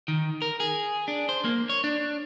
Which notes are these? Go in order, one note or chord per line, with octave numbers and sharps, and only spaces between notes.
D#3
A#4
G#4
D4
C5
A#3
C#5
D4